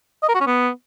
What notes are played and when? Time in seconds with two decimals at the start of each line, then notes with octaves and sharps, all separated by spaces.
0.23 D#5
0.29 A#4
0.34 F#4
0.40 C#4
0.46 B3